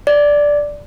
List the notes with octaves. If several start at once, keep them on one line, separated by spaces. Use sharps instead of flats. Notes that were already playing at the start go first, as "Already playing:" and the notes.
D5